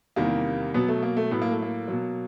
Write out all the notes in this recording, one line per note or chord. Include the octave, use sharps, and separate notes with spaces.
E2 C3 D#3 G3 A#3
B2 F#3 B3
A3
A#3
A3
A2 F#3 B3
A#3
A3
A#3
B2 F#3